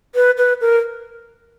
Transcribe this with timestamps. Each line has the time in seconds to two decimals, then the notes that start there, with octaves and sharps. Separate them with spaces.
0.15 B4
0.38 B4
0.61 A#4